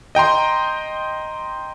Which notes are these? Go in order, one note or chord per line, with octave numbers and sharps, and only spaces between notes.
D#5 G5 A#5 C6